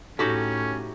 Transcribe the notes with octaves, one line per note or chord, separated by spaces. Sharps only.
A2 C#4 D#4 F#4 G4 A4